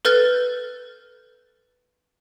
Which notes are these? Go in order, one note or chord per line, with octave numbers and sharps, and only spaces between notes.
A4 B4 F6 G6 A6